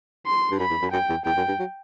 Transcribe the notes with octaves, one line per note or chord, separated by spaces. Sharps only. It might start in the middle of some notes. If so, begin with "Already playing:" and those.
C6
G2
F#2 B5
E2
F#2
F#2 G5
E2
E2 G5
F#2
G2
F#3